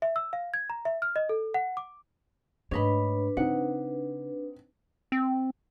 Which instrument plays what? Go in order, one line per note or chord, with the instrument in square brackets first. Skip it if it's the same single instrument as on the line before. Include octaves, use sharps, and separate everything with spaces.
[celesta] E5
E6
F5
G#6
A#5
E5
F6
D#5
A4
F#5
D6
[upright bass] G#2 A3 [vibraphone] D4 B4 [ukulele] C#5 D#5 B5
[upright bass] C#3 [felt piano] C4 D#4 [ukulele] F#5
[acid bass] C4